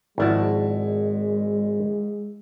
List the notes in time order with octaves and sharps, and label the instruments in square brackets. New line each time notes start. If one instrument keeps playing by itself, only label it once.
[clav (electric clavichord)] G#1 D5 A5 [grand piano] F3 E4 F#4 [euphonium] G#3